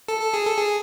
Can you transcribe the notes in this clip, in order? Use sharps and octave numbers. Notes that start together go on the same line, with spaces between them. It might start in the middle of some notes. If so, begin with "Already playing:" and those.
A4
A4
G#4
A4
G#4